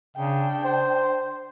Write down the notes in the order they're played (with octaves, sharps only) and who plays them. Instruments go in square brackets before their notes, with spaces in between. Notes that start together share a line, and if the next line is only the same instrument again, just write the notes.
[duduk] C#3 [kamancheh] D4 G5
[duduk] C5